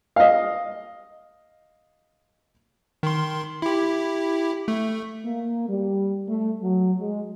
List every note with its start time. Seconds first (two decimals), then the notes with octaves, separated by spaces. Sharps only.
0.16 D#5 F5
3.03 D#3 C6
3.62 E4 G4
4.68 A3
5.25 A#3
5.69 G3
6.28 A3
6.62 F#3
6.99 G#3